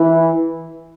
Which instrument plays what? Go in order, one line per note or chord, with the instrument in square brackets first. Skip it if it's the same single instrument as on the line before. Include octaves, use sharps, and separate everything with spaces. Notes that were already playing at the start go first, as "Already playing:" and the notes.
Already playing: [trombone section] E3